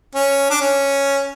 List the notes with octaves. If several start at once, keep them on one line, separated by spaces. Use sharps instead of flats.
C#4
D4
C#4